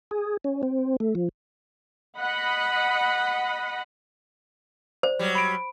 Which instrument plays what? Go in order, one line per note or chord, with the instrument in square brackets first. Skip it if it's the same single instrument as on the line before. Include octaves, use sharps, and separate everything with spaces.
[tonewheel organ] G#4
C#4
C4
A3
F3
[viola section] D#5 F#5 B5
[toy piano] C5 [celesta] D5
[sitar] F#3 G3
[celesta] B5 D7